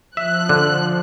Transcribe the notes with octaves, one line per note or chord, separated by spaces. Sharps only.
F3 E5 F#6
D3